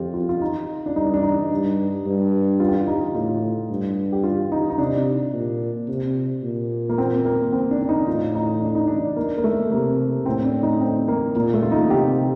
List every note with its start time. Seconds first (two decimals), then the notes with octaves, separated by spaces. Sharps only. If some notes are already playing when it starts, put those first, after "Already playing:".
Already playing: F2 F4 G4
0.14 F4
0.29 F4
0.41 D#4
0.86 D4
0.96 G2 D#4
1.14 D4
1.23 D#4
1.51 G2
2.06 G2
2.60 F4
2.68 G4
2.76 F4
2.87 D#4
3.15 A2 F4
3.69 G2
4.12 G4
4.24 F4
4.52 D#4
4.70 D#4
4.78 C3 D4
5.33 A#2
5.88 C3
6.43 A#2
6.89 A#3
6.98 C4
7.25 A#3
7.52 C4
7.71 D4
7.81 D4
7.89 D#4
8.07 A2 F4
8.35 D#4
8.61 D4
8.75 D#4
8.87 D4
9.16 A#3
9.37 A#3
9.44 A3
9.71 C3 A#3
10.26 A2 C4
10.44 D4
10.63 D#4
10.81 C4
11.08 A#3
11.35 A#2 A#3
11.54 A3
11.63 F4
11.72 D#4
11.90 C3 G4